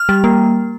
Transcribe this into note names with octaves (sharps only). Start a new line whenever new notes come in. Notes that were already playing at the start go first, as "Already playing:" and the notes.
Already playing: F6
G3
A#3